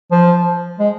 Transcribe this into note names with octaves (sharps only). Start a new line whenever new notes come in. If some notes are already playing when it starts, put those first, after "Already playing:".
F3
G#3